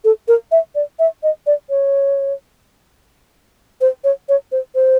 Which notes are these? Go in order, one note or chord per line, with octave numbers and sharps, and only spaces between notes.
A4
A#4
E5
D5
E5
D#5
D5
C#5
C5
C#5
C#5
C5
C5